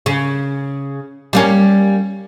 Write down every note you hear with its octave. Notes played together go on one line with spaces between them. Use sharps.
C#3
G3 A#3 C#4